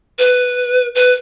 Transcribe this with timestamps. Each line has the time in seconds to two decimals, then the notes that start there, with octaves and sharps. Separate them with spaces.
0.19 B4
0.95 B4